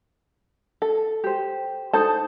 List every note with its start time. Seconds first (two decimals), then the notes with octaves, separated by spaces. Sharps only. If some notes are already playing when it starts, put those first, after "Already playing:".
0.82 A4
1.24 G4 C5
1.93 D#4 A4 C5 A5